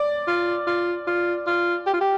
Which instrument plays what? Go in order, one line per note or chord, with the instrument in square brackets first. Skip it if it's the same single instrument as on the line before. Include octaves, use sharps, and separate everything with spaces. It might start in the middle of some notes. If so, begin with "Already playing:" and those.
Already playing: [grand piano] D5
[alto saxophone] F4
F4
F4
F4
G4
F4
G4